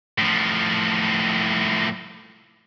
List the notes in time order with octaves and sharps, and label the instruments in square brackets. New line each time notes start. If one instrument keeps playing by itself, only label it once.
[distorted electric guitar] A2 F3